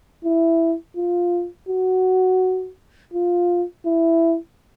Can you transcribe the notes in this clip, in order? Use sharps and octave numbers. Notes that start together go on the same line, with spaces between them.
E4
F4
F#4
F4
E4